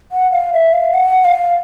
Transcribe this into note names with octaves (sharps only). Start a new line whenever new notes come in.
F#5
F5
E5
F5
F#5
F5